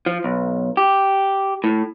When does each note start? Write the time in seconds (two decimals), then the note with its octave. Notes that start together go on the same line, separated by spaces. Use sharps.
0.06 F3
0.24 B1
0.77 G4
1.64 A2